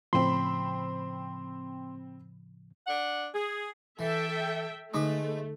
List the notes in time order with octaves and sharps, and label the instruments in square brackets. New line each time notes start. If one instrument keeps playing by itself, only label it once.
[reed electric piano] A2 C#3 F3 [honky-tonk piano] C4 B5 [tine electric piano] C6
[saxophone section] D4 F#5
G#4
[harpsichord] E3 [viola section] A4 E5 G5
[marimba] D3 D#4 D#6 [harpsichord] G#3 B4 [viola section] A3